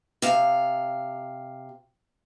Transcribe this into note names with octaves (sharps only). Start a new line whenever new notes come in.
C3 F5